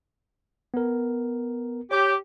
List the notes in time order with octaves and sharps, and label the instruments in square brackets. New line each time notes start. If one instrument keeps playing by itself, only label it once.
[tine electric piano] B3 A#4
[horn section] G4 [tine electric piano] C#5